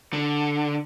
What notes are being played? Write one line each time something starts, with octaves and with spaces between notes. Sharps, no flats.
D3